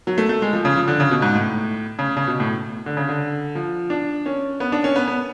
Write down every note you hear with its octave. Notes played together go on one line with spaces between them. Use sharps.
F#3
A3
A3
G#3
F3
C#3
F3
D3
C#3
B2
G#2
A2
C#3
C#3
B2
A2
D3
C#3
D3
F3
D4
C#4
B3
D4
C#4
B3
B3